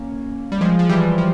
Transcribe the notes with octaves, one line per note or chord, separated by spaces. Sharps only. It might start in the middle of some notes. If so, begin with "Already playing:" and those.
Already playing: A#3 C#4
G3
F3 G#3
F3
E3 G3
F3